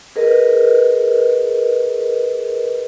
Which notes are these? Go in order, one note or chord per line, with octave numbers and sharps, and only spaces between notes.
G#4 A#4 B4 D#5